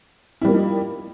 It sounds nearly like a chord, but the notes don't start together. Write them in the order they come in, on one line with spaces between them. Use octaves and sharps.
E4 G3 A#3 F3 D#4